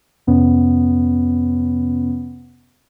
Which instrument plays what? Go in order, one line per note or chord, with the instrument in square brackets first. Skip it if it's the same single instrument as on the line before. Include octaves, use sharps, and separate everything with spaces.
[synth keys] F2 C3 B3 C#4